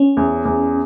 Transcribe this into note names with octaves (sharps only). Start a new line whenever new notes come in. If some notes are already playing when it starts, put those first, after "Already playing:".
Already playing: C#4
E2
E2